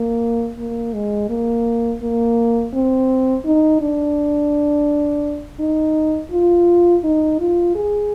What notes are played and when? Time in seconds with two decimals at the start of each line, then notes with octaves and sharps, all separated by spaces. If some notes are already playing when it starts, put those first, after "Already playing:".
Already playing: A#3
0.59 A#3
0.94 G#3
1.29 A#3
2.02 A#3
2.74 C4
3.45 D#4
3.81 D4
5.60 D#4
6.31 F4
7.03 D#4
7.40 F4
7.75 G#4